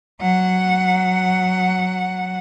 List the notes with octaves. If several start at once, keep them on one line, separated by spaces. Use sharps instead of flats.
F#3 F#5